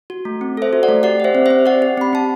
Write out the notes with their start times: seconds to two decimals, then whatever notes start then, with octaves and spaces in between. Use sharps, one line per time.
0.10 F#4
0.25 A3
0.41 C4
0.57 A4 C5 E5
0.73 F#4
0.83 D5 F#5
0.89 A3
1.03 G4 D5 F#5
1.20 G4 C5 E5
1.35 C4
1.46 C4 C5 E5
1.66 G4 D5 F#5
1.82 G4
1.97 C4 B5
2.13 C4 A5